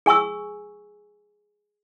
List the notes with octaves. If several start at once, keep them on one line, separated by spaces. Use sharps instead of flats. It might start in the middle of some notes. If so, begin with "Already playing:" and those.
G#4 G#5 C#6 E6